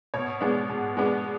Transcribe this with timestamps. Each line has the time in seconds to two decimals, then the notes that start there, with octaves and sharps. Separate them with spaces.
0.14 B2 C#5
0.41 G#3 B3 D4
0.69 B2
0.97 G#3 B3 D4